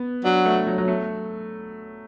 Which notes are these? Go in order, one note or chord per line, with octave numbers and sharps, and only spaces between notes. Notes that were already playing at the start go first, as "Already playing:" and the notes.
Already playing: B3
F#3 D4
A3
F#3
F#3
A3